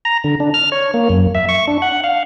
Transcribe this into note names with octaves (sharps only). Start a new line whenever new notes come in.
A#5
D3
D4
F6
C#5
A#3
F#2
E5
C#6
D4
F#5
F5